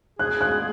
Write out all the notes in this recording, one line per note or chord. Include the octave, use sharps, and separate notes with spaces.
G#4 F#6
F#6